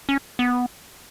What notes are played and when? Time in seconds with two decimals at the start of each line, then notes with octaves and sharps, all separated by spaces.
0.09 C#4
0.39 B3